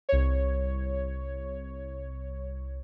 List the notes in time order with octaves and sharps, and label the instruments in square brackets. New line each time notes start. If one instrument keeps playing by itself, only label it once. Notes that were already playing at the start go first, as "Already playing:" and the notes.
[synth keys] C2 C#5